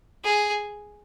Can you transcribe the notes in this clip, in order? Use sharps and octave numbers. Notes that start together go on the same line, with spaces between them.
G#4